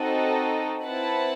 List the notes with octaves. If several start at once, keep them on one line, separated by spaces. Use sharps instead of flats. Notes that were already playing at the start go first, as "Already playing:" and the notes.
Already playing: C4 D#4 F#4 A4 D#5
C4 E4 B4 F#5 A5